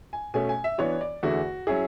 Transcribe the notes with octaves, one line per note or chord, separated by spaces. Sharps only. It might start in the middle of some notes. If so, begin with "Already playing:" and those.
G#5
B2 A3 C#4 G#5
G#5
E5
E3 B3 D4 F#4 C#5
D5
E2 D3 A3 E4 F#4 G#4
F#3 C#4 E4 G#4